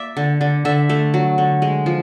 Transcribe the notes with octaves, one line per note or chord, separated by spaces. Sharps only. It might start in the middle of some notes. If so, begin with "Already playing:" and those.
Already playing: A#3 D5 E5
D3
D3
D3 E5
A3
F#3
D3
G#3
F3